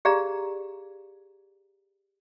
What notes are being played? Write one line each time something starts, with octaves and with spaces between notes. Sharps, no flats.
G4 G#4 D5 F5 A#5